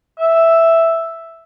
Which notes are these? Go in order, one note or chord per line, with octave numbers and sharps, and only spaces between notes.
E5